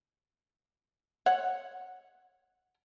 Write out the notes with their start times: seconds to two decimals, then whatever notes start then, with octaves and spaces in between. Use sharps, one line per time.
1.26 C#5 F#5